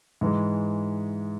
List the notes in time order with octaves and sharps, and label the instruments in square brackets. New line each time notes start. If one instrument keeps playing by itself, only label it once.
[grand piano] G#2 E3 G#3